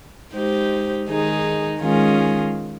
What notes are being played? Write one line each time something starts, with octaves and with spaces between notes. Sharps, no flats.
G#3 D#4 G4 C5
D#3 G#3 D#4 G#4
D#3 G#3 C#4 F4 G#4